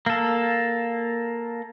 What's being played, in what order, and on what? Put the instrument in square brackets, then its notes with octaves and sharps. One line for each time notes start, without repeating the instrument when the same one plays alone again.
[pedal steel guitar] A#3 A4